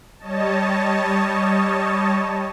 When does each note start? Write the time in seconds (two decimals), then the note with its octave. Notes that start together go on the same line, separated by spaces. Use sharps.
0.19 G3 C#5 D#5 A5